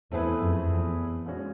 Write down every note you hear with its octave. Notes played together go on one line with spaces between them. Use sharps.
E2 A3 C4 E4 G#4 B4
F2
E2
A#2 F3 G#3 C#4 F#4